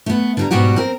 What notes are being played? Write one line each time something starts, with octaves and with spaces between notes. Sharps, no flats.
A3 B3
D3 G3 A#5
G#2 B2 G3 B3 F#4 G4
C4 A#4